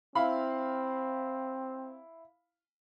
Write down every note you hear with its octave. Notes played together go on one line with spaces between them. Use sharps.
C4 E4 F5 B5